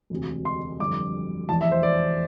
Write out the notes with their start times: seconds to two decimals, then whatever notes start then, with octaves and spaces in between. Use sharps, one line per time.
0.10 E1 D2 C3
0.45 C6
0.80 G1 F2 D3 G3 D6
1.49 F1 E2 E3 A5
1.61 E5
1.72 C5
1.83 D5